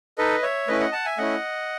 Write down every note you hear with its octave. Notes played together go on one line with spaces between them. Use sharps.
D#4 A4 B4 D#5
C#5 E5
A3 C#4 E4 B4 D#5
D#5 F#5
F#5 A5
E5 G#5
A3 C#4 E4 D#5 F#5